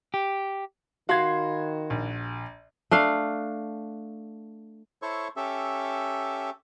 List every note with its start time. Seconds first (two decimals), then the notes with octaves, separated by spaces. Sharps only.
0.14 G4
1.09 D#3 F#4 F5 B5 C6 G#6
1.90 A#1
2.91 A3 D4 F5
5.02 E4 A4 C5 C#5 C#6
5.36 C#4 G4 A4 E5